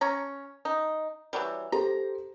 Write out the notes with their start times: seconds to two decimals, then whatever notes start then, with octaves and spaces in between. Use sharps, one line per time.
0.01 C#4 C#5 A#5
0.65 D#4
1.33 E3 F#3 G3
1.72 G4 A4 C5 A#5